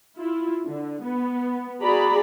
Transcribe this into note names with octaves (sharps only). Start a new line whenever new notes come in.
E4 F4
D3
B3
F#4 G#4 D5 A#5 B5